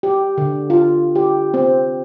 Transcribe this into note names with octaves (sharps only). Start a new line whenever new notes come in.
G4
D3
F4
G4
C4